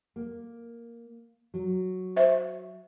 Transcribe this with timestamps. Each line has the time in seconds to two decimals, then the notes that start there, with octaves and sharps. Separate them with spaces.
0.16 A#3
1.54 F#3
2.16 C5 E5